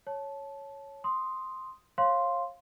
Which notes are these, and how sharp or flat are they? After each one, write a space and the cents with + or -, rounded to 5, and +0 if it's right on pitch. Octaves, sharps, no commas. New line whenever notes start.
C#5 +0 A5 -15
C6 +0 D#6 +0
C#5 -35 F5 +0 C6 +0